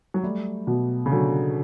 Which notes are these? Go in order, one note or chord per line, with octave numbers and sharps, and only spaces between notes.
F#3
G3 A3
B2
C#3
D3 F#3